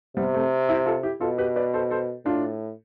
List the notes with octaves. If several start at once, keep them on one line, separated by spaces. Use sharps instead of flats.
C3 G3 B3
A3 C4
E4 G4
F4 A4
E4 G4
B2 F4 A4
G4 B4
B4 D5
A4 C5
A4 C5
A2 D4 F4